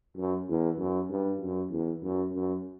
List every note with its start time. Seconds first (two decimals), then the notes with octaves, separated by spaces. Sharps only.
0.17 F#2
0.48 E2
0.78 F#2
1.10 G2
1.41 F#2
1.71 E2
2.02 F#2
2.33 F#2